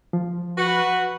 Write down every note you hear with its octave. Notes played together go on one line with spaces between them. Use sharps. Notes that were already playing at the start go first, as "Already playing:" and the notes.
F3
F#4 B4